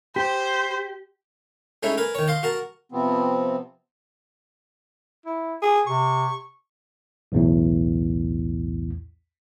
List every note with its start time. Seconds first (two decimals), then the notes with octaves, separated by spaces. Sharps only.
0.16 G4 C5
1.83 G#3 A3 C#4 D#4 E4
1.98 A#4 B4 G#5
2.15 D#3 C#5
2.28 D#5 F5 C6
2.43 F#4 A#4 A5
2.92 C3 F3 B3 C4
5.26 E4
5.62 G#4
5.87 C3 C#6
7.32 B1 E2 A2